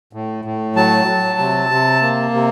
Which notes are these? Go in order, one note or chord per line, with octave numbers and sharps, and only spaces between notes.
A2
A2
F#3 A5
F#3
C3
C3
A#3
C3